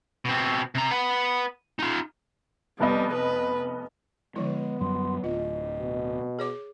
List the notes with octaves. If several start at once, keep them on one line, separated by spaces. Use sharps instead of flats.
B2 C4
C3 A#5
B4 F#5
D#4 F4
F1 G3 B3 D#5
B4
D3 F3 G#3 B3 E4
F#2 F#3 G3 C6
D1 F4 D#5
B2
G#4 C#5 D6